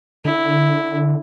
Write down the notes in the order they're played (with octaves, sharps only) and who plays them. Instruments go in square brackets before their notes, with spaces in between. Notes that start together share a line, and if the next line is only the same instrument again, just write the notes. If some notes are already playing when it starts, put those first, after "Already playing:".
[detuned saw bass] D3 [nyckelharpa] E4